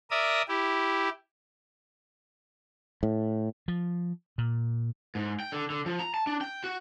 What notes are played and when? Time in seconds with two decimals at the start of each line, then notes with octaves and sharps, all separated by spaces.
0.10 A#4 D5 E5 D#6
0.48 E4 G4
3.03 A2
3.68 F3
4.38 A#2
5.15 G#2
5.40 G5
5.52 D3
5.70 D3
5.86 F3
6.00 A#5
6.14 A5
6.27 D4
6.41 G5
6.64 F#4